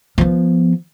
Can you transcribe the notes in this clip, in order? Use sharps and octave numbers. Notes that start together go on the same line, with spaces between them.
F3 B3